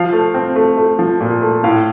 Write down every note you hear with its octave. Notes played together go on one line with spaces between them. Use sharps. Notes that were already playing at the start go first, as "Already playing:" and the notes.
Already playing: F3 F5
A3
C4
A3
A3
F3
A#2
A3
A2 F5